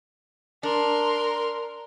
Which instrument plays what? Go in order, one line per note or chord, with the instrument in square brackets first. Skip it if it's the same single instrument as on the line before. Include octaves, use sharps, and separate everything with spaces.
[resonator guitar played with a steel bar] D4 [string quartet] A#4 C6